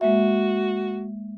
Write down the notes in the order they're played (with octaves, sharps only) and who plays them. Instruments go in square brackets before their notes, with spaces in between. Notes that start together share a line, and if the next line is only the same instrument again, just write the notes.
[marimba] G#3 A#3 E5 [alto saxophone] F#4